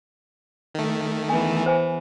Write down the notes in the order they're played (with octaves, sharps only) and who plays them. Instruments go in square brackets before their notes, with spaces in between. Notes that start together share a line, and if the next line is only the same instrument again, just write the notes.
[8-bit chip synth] D#3 A3
[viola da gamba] E2 E3 [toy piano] G#5
[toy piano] C5 G#5